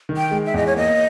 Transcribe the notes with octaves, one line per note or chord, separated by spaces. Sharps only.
D#3
G5
G#3
E5
E2 D#5
C#5
A#3 D#5